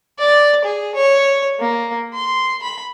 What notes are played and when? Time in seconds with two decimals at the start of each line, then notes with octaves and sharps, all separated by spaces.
0.19 D5
0.64 G#4
0.95 C#5
1.59 A#3
2.13 C6
2.62 B5